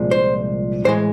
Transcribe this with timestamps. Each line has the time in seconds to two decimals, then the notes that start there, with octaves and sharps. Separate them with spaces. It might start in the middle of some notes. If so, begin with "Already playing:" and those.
Already playing: C2 A#2 F3 G#3
0.11 C5
0.84 A2 E3 G#3 C5